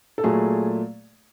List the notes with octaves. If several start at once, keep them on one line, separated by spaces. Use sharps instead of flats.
A4
A#2 F#3 A3 G#4